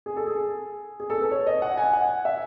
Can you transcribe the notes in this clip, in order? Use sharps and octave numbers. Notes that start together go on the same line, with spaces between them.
G#4
A4
G#4
G#4
A4
B4
C#5
D#5
F#5
G#5
F#5
E5